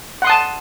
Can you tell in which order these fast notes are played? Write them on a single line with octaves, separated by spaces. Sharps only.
F#5 C6 D#6 A5